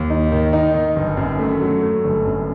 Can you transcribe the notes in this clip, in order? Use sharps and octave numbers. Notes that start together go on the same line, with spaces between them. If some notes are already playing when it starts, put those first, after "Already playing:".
Already playing: D#2
D#4
D#3
D#4
D#3
G1
F#2
A3
F#3
A3
G1
F#2